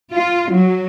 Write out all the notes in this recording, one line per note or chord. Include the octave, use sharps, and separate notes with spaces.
F4
F#3